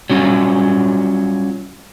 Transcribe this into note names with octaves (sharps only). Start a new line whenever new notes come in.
F#3 G3 C#4 F4